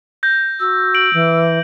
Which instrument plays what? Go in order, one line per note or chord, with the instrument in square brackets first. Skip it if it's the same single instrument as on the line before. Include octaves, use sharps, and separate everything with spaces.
[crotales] G6 A#6
[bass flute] F#4 [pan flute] E6
[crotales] D7 F#7
[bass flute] E3